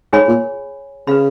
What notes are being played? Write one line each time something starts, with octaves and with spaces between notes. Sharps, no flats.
G#2 G#4 C#5 G#5 B5
A#2
C#3 B4 F5 B5